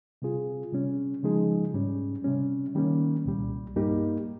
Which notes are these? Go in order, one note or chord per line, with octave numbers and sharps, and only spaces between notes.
C3 G3 C4 F4 G#4
C3 G3 C#4
C#3 F3 G#3 D#4 G#4
G#2 G3 C#4
C3 G3 C#4
D#3 G3 A#3 C#4
C2 A#2 G3
G2 G3 A#3 D#4 G4